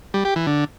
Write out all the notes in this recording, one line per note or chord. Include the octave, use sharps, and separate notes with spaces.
G3
G4
E3
D3